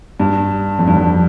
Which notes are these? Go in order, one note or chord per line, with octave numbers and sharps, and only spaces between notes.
G2
F2
G2
F2